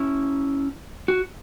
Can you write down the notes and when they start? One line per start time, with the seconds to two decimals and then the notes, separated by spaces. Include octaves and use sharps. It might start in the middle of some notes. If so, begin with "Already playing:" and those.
Already playing: C#4 E4
1.08 F#4